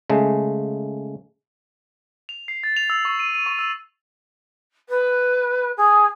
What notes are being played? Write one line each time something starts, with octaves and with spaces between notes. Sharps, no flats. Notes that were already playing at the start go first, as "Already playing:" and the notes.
C#3 G#3 A3
F7
C7
A6
F7
E6
C#6
D#7
D#7
C#6
E6
B4
G#4